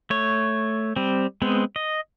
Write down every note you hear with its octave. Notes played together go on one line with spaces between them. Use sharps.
A3 C#5
G3 C4
G#3 B3 C4
D#5